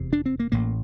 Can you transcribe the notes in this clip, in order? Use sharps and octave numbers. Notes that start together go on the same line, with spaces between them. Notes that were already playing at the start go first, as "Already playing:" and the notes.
Already playing: F1 E2 C3
D4
C4
A#3
A1 A2 A#3